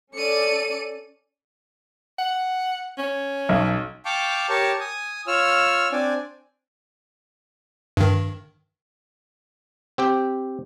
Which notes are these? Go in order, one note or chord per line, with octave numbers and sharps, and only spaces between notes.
C#4 A4 D5 C#7 D#7
F#5
C#4
B1
F5 G5 A5 C#6 D6
G4 A#4 C#5 A5 C#6
G#5 D#6
F4 C#5 E6 F6
C4 D4 D5 G#5
G2 D#3
C4 G4 G5